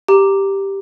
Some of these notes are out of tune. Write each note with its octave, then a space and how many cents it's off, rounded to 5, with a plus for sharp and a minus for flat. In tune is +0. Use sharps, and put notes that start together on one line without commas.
G4 +0 A#5 +0